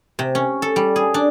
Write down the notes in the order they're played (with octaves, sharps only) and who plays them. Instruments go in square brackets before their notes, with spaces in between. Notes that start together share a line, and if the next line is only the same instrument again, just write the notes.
[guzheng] C3
C#4
A4
G3
G#4
D4